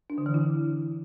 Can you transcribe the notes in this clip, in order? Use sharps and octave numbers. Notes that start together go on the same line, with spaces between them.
D4
D3
E3
E4